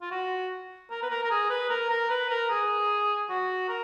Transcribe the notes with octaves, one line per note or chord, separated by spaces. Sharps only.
F4
F#4
A#4
B4
A#4
A#4
G#4
B4
A#4
A#4
B4
A#4
G#4
F#4
A#4